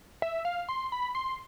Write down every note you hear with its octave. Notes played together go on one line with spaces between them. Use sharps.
E5
F5
C6
B5
C6